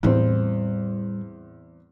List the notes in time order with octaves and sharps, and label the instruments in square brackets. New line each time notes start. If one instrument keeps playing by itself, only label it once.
[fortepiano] E2 C4 [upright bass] A2 G3